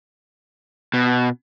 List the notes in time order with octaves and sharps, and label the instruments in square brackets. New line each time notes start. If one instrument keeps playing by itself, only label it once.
[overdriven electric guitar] B2